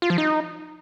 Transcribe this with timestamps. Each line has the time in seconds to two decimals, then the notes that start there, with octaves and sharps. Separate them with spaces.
0.02 F4
0.10 F3
0.18 D#4